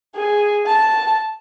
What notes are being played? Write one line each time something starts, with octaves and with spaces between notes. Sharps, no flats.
G#4
A5